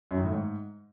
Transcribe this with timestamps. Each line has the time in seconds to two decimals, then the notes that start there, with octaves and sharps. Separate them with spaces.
0.11 F#2
0.18 D#3
0.25 A2
0.32 G#2